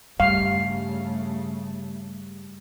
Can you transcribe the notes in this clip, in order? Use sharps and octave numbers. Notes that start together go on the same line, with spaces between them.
G2 C#3 G3 A3 F5